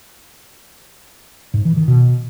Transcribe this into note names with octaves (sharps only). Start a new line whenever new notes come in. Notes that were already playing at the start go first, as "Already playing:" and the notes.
G#2
E3
D#3
B2